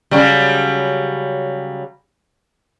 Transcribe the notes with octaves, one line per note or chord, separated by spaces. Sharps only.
C#3 F#3 G3